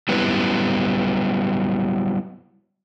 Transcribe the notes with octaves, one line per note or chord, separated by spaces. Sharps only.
F#3 G3 B3 E4 B4